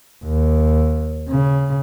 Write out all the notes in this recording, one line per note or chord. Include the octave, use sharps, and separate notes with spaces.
D#2
C#3